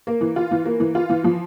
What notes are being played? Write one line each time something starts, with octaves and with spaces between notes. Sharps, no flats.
A#3
E3
F4
E3
A#3
E3
F4
E3
F3